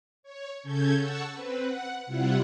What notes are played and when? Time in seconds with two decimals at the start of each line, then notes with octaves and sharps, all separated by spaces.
0.23 C#5
0.63 C#3 C#4 A4 G6 G#6
0.97 F#5 A5 C#6 E6
1.32 C4 B4
1.61 F#5
2.06 C3 G3 E4 F4 F#5